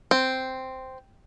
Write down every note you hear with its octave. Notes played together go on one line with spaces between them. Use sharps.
C4